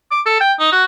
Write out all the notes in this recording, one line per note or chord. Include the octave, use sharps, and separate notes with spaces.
D6
A4
G5
D#4
F#4